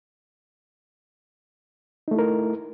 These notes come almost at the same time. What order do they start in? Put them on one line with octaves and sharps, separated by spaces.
D#4 A3 E4 A#4